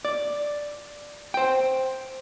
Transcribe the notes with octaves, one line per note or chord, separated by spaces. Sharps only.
D5
C5 G5